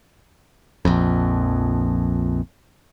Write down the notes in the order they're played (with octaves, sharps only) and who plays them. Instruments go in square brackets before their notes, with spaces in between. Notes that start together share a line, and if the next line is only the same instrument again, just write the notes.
[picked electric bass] A#1 F2